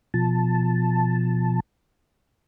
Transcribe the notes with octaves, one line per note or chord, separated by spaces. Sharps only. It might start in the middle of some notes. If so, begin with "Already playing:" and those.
B2 F3 A5